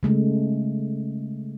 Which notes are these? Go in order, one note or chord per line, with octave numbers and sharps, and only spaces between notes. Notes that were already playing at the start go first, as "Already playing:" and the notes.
C#3 G#3 A3